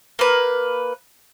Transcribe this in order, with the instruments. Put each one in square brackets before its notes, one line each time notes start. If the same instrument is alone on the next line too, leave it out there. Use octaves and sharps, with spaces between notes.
[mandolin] A#3 B4